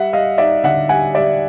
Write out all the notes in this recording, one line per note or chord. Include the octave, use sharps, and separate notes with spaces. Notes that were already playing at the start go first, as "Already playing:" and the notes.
Already playing: G3 E5 F#5
G3 D#5 F5
D#4 D5 E5
D3 E5 F#5
G3 F#5 G#5
G3 D5 E5